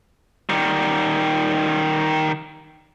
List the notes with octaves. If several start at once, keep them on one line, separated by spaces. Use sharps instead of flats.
D#3 G3